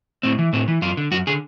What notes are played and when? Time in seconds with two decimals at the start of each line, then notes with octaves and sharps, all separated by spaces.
0.23 A2 C4
0.39 E3
0.53 A2 C4
0.68 E3
0.82 F#2 F4
0.97 D3
1.11 F#2 F#4
1.27 D3 G#4